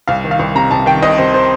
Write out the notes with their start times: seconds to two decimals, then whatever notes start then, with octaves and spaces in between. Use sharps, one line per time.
0.08 C2 F5
0.24 D#3
0.31 F5
0.39 C2
0.55 C3 A#5
0.71 C2 A5
0.86 D#3 G5
1.02 C2 D#5
1.18 C3 C5
1.34 C5